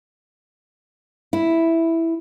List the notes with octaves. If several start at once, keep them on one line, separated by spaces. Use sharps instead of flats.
E4